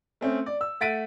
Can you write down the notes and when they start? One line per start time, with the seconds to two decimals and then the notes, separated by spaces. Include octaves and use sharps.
0.21 A3 C4 C#4
0.46 D5
0.61 E6
0.81 A3 F#5 A6 B6 D7 D#7